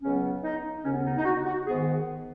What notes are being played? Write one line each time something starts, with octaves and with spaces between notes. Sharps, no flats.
C#2 C#3 F#3 B3 C#4
D#4
D#2 C#3 B3 C#4
D#4
D#4
F#4
F#4
G#2 D#3 B3 G#4